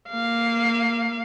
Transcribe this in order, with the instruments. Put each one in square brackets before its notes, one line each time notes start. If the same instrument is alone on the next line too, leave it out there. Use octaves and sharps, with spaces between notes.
[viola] A#3 F5